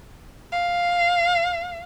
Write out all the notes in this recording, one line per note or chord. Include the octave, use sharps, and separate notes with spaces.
F5